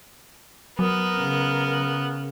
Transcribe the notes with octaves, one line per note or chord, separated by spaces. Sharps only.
F#3 B3 A#4
C#3